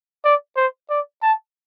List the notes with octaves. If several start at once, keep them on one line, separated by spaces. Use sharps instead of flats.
D5
C5
D5
A5